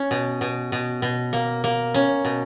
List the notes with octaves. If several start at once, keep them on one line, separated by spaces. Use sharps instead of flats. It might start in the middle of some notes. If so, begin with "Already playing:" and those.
Already playing: C#4
B2
B2
B2
B2
A#3
A#3
C#4
B2